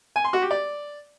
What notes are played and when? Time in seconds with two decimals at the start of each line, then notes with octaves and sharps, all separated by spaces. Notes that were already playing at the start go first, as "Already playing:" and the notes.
0.16 G#5
0.24 C6
0.33 F#4
0.42 G4
0.51 D5